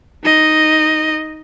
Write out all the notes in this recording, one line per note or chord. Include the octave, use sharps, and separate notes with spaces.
D#4 D#5